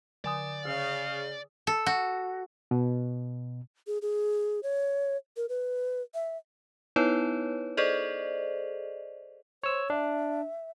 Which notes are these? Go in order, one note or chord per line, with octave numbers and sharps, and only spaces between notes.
D3 D5 G#5 D#6
C#3 G#4 F5
A4
F#4
B2
G#4
G#4
C#5
A#4
B4
E5
B3 D#4 E4 B4 C#5
G#4 A4 C5 D5 D#5
C5 C#5 E6
D4 E5